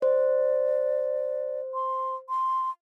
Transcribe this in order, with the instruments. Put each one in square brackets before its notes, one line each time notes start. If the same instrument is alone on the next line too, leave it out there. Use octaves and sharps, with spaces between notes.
[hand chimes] C5 [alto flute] D5
[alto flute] C6
C6